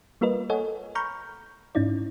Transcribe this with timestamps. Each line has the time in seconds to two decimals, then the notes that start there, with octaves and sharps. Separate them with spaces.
0.21 G3 A#3 F4 A#4 B4 D#5
0.50 A4 C#5 D#5 F#5 G#5
0.95 A#5 B5 C#6 F6 G6
1.75 G#2 C#4 D#4 E4 D5